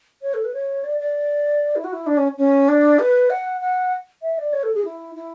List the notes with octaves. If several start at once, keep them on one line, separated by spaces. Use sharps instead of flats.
C#5
A4
B4
C#5
D5
D5
E4
F#4
E4
D4
C#4
C#4
D4
B4
F#5
F#5
E5
D5
C#5
A4
G#4
E4
E4